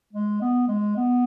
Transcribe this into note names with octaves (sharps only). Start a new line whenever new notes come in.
G#3
B3
G#3
B3